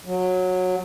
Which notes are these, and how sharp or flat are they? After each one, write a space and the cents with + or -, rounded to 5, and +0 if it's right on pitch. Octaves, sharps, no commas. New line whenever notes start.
F#3 -15